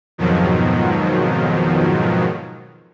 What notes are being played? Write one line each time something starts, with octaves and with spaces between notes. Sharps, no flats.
F2 G#2 B2 D#3 F3 F#3